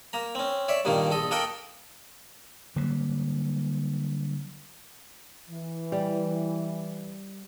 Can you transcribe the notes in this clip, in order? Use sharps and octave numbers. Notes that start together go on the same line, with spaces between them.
A#3 A#5
C4 C#4
C#5 D5 E5
G2 A#2 D#3 A#3
A#1 A4 D#5
A#3 A4 A#4 D#5 F#5 G5
D3 F#3 G3 A#3
E3
G3